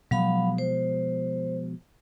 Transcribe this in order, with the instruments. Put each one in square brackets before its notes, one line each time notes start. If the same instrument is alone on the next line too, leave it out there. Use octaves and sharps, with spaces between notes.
[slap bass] B2 F3 G#3 [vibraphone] F#3 F5 B5
[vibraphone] C5